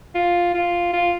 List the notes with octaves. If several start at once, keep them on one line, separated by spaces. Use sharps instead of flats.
F4
F4
F4